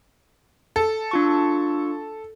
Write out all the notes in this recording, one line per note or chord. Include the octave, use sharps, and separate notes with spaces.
A4
D4 F4 C#6